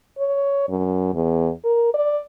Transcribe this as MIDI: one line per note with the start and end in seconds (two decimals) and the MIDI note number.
0.19 0.65 73
0.69 1.10 42
1.14 1.51 40
1.65 1.94 70
1.94 2.21 74